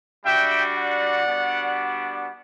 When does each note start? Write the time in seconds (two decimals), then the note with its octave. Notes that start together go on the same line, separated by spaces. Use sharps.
0.25 G3 D4 F#4 E5 G5
0.76 D5 F#5
1.27 G3 B3 D4 F#4